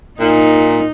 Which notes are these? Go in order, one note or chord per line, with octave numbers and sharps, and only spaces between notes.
A#2 D#4